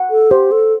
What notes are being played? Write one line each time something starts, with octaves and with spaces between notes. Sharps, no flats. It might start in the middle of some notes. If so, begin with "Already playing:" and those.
Already playing: F#5
A4
G4 C5
A4